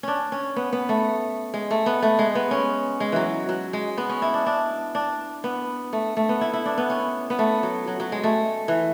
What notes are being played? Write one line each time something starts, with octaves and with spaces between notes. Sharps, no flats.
C#4 D4
C#4
B3
B3
A3
G#3
A3
B3
A3
G#3
B3
C#4
G#3
E3 F#3
F#3
G#3
B3
C#4
E4
D4
D4
D4
B3
A3
A3
B3
E4
E4
D4
B3
C#4
B3
A3
F#3
F#3
F#3
G#3
A3
E3